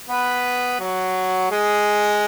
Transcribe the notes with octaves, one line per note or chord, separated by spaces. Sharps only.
B3 B4
F#3 F#4
G#3 G#4